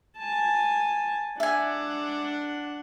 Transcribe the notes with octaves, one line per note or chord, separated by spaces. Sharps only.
G#5 A5
D4 E5 F#5 G#5